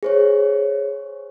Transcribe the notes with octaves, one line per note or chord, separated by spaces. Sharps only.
G#4 C5 C#5